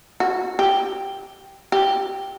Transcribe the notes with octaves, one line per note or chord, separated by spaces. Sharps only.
F#4
G4
G4